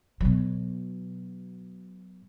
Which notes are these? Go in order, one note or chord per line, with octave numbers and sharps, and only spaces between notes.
B2 F#3